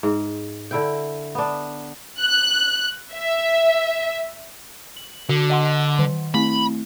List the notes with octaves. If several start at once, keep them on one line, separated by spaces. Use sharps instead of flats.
G#2
D3 E4 G5
B3 D4
F#6
E5
F#7
D3 F#4
D#5 F#5 C6
D#3
A3 C4 E4 B5